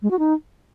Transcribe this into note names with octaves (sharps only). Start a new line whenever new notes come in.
G#3
F#4
D#4